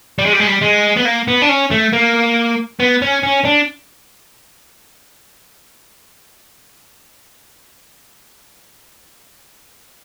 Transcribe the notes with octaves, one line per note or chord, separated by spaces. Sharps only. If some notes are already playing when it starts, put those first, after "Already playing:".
G3
G#3
G3
G#3
G3
G#3
B3
A#3
B3
D4
C#4
A3
A#3
B3
C#4
C#4
D4